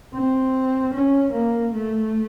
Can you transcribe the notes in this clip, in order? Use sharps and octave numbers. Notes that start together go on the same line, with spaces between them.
C4
C#4
A#3
A3